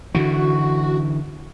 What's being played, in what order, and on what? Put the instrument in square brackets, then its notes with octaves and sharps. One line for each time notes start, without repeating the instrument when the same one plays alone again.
[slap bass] D3 E3 [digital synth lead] F#4